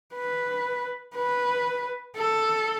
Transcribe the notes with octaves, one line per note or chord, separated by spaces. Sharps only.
B4
B4
A4